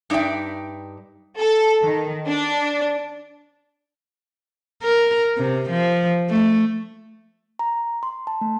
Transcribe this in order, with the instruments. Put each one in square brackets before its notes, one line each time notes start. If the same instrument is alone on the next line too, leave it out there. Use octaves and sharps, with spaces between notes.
[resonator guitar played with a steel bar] G2 D#4 D5 E5 G5
[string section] A4
D#3
D4
[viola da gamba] A#4
C3
F3
A3
[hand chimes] A#5
C6
A5
A3